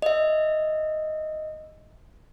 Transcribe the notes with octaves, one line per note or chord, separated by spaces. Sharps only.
D#5 E5